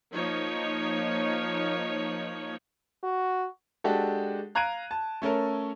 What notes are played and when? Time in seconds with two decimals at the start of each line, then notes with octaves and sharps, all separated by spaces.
0.13 F3 A#3 D#4 C#5
3.03 F#4
3.84 G#3 D4 F#4 G4 A4
4.55 F5 A#5 F#6 G#6 D7 D#7
4.91 A5
5.22 A3 C#4 A4 A#4